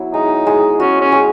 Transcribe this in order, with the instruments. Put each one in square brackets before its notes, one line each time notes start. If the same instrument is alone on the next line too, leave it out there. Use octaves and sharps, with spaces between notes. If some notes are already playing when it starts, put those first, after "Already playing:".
Already playing: [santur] F#3 B3 E4
[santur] G#3 [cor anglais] D#4
[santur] G#3
[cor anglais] C#4 [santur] F#4
[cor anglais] C#4
[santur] G#3